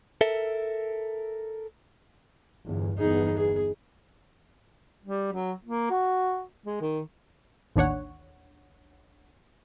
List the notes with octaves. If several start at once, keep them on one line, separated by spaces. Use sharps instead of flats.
A4 A#4 E5
G1 E2
G1 E2 B3 D#4 G#4
G#4
G3
F#3
A#3
F#4
G#3
D#3
A1 D#2 D4 C#5 F#5